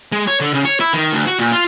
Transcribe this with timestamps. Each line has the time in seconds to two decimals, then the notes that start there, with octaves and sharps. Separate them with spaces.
0.12 G#3
0.28 C#5
0.41 D3
0.54 C#3
0.65 C#5
0.80 E4
0.93 D#3
1.13 D2
1.27 F#4
1.39 A#2
1.52 F4